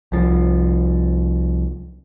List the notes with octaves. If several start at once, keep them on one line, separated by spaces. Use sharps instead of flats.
C2 F3